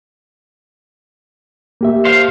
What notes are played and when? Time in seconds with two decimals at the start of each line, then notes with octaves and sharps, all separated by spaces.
1.81 A#3 G4 E5
2.05 C5 F5